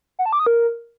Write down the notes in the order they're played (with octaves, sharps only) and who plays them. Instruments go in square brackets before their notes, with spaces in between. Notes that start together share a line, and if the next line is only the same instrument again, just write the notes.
[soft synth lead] F#5
A5
D6
D#6
A#4